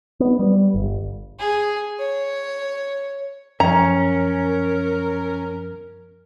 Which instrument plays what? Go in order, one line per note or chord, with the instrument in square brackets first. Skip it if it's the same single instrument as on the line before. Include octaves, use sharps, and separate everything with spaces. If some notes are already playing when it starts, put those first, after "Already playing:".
[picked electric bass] B3
G3
G1
[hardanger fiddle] G#4
C#5
[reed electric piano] F#2 F3 [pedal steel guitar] C#4 [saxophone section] A#4 [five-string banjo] A#5